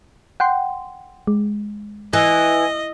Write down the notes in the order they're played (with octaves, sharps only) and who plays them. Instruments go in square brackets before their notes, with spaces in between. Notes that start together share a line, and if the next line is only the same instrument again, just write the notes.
[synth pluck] F#5 G5 C6
G#3
[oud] E3 [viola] D#5 [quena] G#5